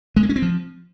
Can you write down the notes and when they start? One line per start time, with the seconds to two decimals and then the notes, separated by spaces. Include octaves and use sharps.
0.16 G#3
0.23 A#3
0.29 C#4
0.36 C4
0.42 F3